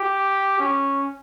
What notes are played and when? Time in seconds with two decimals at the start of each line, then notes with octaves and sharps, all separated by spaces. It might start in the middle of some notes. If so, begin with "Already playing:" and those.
Already playing: G4
0.60 C#4